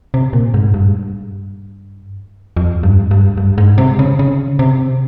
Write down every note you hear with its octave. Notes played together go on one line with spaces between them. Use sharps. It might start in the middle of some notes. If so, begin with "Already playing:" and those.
C3
A#2
G#2
G2
F2
G2
G2
G2
G#2
C3
C#3
C#3
C3